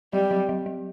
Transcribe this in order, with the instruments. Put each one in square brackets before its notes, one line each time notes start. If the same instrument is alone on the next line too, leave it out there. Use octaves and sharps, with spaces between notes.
[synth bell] F#3 [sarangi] G3
[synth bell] F#3
F#3
F#3